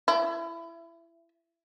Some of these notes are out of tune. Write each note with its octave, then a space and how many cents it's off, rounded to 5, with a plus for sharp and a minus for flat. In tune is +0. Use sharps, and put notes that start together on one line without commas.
E4 +25